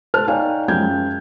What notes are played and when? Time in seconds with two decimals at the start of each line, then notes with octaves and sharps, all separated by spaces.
0.14 A4 C5 A5 F6 F#6
0.28 D#4 C#5 D5 F5 G5 G#5
0.68 F#2 F3 G#3 G5 G6 G#6